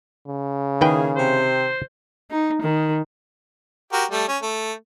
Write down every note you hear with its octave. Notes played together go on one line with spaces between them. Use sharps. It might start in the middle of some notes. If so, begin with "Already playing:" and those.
C#3
D#3 A#3 E4 G#4 B4 G5
C3 C4 C5
D#4
D#3
F#4 G4 A#4
G3 A3
C#4
A3